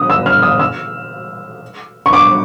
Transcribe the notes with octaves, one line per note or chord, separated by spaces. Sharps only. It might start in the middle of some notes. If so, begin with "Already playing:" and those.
Already playing: D#6
E6
F6
D#6
E6
C#6
D6